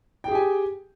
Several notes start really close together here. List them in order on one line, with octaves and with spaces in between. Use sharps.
G5 G#4 G4 G#5